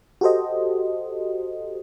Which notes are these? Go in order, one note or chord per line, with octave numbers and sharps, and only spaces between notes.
F#4 G4 A4 C5 D#5